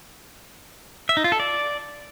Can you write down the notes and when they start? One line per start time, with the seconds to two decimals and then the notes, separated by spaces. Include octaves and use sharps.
1.09 E5
1.17 D#4
1.24 F4
1.32 A4
1.40 D5